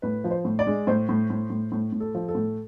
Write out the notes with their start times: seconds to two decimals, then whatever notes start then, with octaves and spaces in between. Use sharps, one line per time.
0.02 A2 B4
0.24 F3
0.31 C5
0.45 A2
0.59 D5
0.67 G#3
0.87 A2 C5
1.09 A2
1.30 A2
1.50 A2
1.72 A2
1.92 A2
2.00 A4
2.15 F3
2.28 A4
2.35 A2